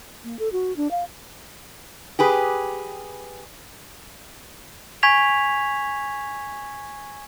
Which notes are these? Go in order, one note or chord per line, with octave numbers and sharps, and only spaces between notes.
A#3
A4
F#4
D4
F5
G4 G#4 B4
G#5 C#6 G#6 B6 F7